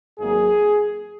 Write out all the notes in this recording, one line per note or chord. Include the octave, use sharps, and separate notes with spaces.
G#1 G#2 F#3 A#3 G#4